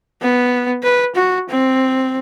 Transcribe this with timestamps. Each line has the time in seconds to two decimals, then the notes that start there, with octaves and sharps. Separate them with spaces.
0.22 B3
0.83 B4
1.16 F#4
1.50 C4